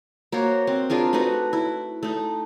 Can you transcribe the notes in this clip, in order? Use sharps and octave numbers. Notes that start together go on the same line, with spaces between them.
A#3 F#4 C5 C#5
C4
D4 F4 G#4 A#4
A3 D#4 F#4 B4
E4
A3 D#4